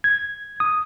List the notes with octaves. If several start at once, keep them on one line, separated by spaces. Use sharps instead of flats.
G#6
D#6